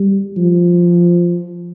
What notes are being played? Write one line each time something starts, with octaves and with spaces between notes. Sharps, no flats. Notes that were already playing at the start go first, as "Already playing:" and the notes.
Already playing: G3
F3